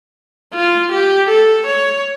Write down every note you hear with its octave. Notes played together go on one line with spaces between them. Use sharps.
F4
G4
A4
C#5